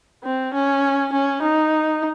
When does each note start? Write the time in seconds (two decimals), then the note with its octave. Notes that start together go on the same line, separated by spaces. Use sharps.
0.24 C4
0.53 C#4
1.13 C#4
1.42 D#4